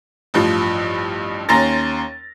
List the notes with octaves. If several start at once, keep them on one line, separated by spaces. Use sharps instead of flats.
A1 G2 F3
D#2 C#4 A#5 C6 A6 A#6